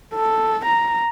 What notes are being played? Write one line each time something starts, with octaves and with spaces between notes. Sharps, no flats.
A4
A#5